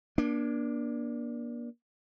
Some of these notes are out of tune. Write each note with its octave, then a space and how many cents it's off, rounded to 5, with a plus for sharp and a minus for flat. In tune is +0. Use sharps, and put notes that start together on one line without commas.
A#3 +40 D4 +0